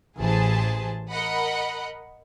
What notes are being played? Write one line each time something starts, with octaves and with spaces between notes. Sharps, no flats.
A1 E3 G#4 C5 G#5 A5
A#4 D#5 F#5 B5